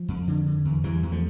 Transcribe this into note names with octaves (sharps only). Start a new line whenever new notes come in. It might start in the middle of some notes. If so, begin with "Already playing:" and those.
Already playing: F3
F2
D3
D3
E2
E2 E3 G3
E2
F3 A3